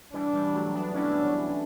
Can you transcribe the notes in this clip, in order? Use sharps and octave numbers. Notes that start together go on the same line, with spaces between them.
E3 G3 D4
E3 G3
F#3 A3
B3 D4
C#4 D4 E4